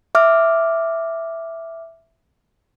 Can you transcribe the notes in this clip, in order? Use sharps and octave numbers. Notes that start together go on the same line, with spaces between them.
E5 D6 F6